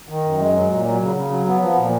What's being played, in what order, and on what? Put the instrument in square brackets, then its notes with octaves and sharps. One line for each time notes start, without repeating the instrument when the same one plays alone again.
[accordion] D#3
F#2
G#3
F#3
A#2
F#3
C#3
C#3
F#3
B3
F3
A#2